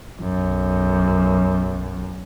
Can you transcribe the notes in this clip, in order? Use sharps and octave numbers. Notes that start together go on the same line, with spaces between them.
B1 F#2